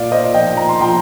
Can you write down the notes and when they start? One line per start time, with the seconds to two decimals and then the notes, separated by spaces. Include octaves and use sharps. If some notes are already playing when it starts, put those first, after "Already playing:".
Already playing: A#2 D5 F5
0.12 C5 D#5
0.34 F3 D#5 G5
0.57 A#5
0.69 C6
0.81 F3 G5 A#5